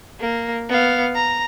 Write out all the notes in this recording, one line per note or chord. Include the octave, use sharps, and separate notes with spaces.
A#3
B3 F5
A#5